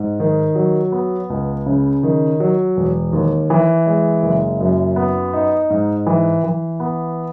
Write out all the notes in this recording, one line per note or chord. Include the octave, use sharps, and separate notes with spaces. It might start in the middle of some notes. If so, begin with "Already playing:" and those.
Already playing: G#2
D#3
F#3
B3
C#2
C#3
D#3
F#3
E1
D#2
E3
G#3
F#1
F#2
B3
D#4
G#2
E3
E3
B3